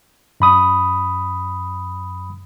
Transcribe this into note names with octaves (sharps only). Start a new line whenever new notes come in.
F#2 B5 D#6